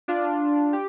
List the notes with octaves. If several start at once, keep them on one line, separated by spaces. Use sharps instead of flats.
D4 F4
G4